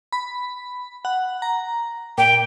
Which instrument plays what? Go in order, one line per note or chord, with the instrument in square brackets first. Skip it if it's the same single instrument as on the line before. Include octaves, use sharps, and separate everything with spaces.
[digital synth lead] B5
F#5
A#5
[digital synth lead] A#2 [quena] G5